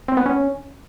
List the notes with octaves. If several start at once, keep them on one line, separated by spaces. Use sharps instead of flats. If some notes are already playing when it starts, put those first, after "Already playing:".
C4
B3
C#4